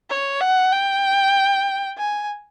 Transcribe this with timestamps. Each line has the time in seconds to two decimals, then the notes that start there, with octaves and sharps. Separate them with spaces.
0.10 C#5
0.41 F#5
0.72 G5
1.98 G#5